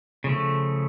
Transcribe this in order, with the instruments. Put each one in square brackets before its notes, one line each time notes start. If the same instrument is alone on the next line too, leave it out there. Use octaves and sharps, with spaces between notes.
[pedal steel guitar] C#3 F3 A3